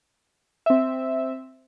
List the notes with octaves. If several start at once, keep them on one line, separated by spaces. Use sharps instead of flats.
C4 E5